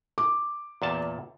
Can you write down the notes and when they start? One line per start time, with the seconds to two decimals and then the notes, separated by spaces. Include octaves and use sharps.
0.18 D6
0.82 E2 A#2 A5